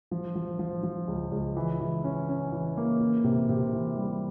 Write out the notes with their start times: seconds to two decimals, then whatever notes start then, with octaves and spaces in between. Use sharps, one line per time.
0.11 F3
0.35 F3
0.59 F3
0.83 F3
1.08 C#2
1.31 C#2
1.57 E3
1.81 E3
2.04 C#4
2.29 C#4
2.52 E3
2.77 A#3
3.01 E3
3.24 C3
3.49 C3
3.73 E3
3.97 G3